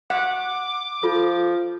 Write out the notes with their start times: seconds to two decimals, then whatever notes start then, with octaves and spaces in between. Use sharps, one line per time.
0.10 F#5 D6
1.03 F3 F4 A4 D#6